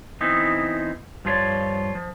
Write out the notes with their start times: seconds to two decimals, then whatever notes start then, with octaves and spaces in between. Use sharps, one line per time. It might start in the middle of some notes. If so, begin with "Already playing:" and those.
0.21 E3 B3 C4 D#4 E4
1.25 G2 F3 F4 C#5 D5
1.95 F3